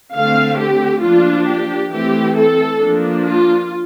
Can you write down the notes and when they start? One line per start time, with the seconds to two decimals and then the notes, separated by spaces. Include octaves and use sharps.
0.14 D3 A3 C4 F5
0.59 G4
1.02 F3 A#3 D4 F4
1.47 G4
1.91 E3 A3 C4 G4
2.36 A4
2.80 F3 A#3 D4
3.25 F4